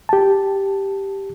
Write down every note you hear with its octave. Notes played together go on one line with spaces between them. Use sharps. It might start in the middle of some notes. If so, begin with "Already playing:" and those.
G4 A5